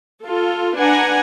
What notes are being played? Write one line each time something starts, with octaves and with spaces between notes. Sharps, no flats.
F4 A4
D4 B4 F#5 G#5 A#5